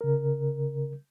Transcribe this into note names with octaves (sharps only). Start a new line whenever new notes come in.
C#3 A#4